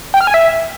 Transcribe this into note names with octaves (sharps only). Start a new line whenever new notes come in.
G5
F6
G#5
E5